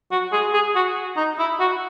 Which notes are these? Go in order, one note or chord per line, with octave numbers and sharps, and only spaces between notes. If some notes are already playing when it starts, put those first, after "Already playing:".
F#4
G#4
G#4
F#4
D#4
E4
F#4